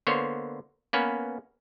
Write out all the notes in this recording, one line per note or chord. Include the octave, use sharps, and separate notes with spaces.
D3 A#3 B3 C5 C#5
A#3 B3 C#4 B4